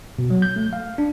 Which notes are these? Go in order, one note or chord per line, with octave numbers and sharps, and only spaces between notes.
B2
F#3
G6
A3
F5
D4